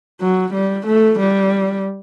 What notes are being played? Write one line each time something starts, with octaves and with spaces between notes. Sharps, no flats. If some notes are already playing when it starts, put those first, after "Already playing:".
F#3
G3
A3
G3